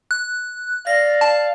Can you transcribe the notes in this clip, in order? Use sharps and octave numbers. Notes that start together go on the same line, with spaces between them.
F#6
D5 F5 A#6
A5